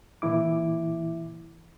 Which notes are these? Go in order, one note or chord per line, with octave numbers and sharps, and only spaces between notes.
A#2 E3 E4 D6